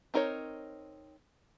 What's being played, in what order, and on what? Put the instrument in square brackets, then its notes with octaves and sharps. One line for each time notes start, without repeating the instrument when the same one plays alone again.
[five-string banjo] C4 D#4 A#4 B4 C#5